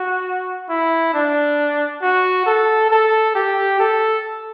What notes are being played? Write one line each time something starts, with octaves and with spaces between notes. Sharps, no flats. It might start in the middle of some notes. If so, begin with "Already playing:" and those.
Already playing: F#4
E4
D4
F#4
A4
A4
G4
A4